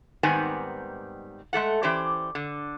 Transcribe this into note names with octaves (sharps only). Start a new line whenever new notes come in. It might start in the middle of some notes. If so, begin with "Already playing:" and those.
G#2 D#3 G3 B3 C4 G#5
G#3 A3 A4 F#5
E3 C#4 G4 C5 D5
D3